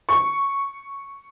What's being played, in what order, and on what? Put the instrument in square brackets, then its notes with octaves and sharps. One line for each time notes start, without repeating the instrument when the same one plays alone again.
[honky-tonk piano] C#6